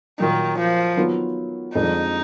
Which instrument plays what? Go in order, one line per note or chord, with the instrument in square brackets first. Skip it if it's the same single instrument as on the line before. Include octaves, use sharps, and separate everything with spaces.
[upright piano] A#2 F#3 A#3 F4 [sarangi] D#3
[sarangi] F3
[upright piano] D#3 F#3 B3 F4
[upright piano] F2 D3 G#3 D4 [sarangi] D#4